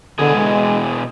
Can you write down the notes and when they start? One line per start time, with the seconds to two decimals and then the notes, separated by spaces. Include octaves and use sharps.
0.19 B2 D3 E3 G#4
0.35 G#3